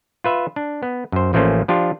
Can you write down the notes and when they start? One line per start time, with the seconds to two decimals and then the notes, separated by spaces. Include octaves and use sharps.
0.24 F4 B4 E5
0.56 D4
0.83 B3
1.12 F#2 C5
1.33 A1 F3 A3 A#3 C#4 C5
1.68 F3 D4 F4 G4